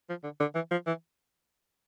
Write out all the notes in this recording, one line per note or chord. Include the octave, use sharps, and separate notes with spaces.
F3
D3
D3
E3
F3
E3